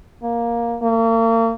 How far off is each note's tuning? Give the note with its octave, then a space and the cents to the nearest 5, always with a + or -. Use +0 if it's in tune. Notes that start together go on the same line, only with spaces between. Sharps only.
A#3 +5
A#3 -40